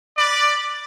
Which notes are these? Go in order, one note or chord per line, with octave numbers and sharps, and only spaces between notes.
B4 D5